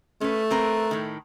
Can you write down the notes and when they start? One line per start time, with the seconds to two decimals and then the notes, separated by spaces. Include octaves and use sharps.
0.21 A3 C#4 B4
0.51 C4 A#4 B4
0.91 A2 D#3